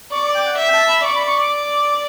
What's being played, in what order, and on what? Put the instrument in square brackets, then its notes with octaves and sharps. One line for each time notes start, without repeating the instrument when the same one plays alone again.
[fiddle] D5 [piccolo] C#6
[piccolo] D6
G5
F#5
[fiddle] E5
[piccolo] G5
A5
B5
[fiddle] D5 [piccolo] C#6
[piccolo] B5
C#6
D6